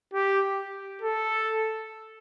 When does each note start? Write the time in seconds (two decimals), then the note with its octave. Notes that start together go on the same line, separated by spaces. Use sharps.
0.14 G4
1.01 A4